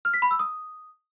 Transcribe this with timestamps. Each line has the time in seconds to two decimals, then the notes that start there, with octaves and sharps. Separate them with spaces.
0.05 F6
0.14 B6
0.22 B5
0.31 E6
0.39 D#6